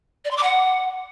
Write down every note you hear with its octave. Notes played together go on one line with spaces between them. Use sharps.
D5
C6
D6
F#5